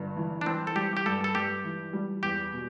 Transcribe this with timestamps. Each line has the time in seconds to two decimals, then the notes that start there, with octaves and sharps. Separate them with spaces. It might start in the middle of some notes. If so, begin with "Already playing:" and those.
Already playing: G1 G2
0.16 E3
0.41 D4
0.46 E3 C4
0.67 A4
0.76 G3 G4
0.97 G4
1.06 G2 A4
1.24 A4
1.35 G2 G4
1.65 E3
1.93 G3
2.23 E2 G4
2.53 B2